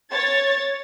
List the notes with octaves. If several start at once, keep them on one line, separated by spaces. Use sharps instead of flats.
C#5 A6